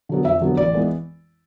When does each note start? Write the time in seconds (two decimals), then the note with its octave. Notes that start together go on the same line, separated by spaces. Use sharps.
0.09 D3 F#3 B3
0.25 F2 E5
0.41 D3 F#3 B3
0.57 A1 D5
0.74 E3 G#3 B3